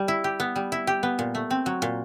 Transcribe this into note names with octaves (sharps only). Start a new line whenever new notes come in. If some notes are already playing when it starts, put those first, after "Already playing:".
Already playing: G3
E4
G4
B3
G3
E4
G4
B3
A#2
A3
C4
F#3
A#2